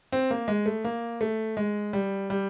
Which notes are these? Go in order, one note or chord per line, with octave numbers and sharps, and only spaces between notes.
C4
A#3
G#3
A3
A#3
A3
G#3
G3
G3